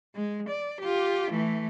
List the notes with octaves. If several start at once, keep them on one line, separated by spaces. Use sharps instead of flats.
G#3
D5
F4 G4
E3 A3